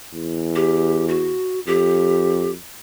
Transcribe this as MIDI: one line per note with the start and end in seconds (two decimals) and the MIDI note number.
0.13 1.35 40
0.55 1.05 67
1.08 1.60 66
1.67 2.54 41
1.67 2.51 67